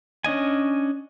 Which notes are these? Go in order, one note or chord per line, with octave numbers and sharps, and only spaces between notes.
C#4 D4 D#5 G#5